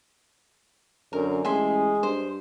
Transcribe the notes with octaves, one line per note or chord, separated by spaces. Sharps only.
F#2 D3 A#4
A1 G#3 E5 G#5 C6
G2 C5